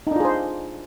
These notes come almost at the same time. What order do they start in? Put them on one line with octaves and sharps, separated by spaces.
D#4 D4 F4 G#4 C5